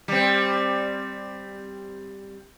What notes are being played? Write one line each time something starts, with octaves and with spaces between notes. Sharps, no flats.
G3 C4